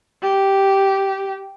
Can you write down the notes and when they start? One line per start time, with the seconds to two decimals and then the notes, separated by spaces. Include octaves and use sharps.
0.22 G4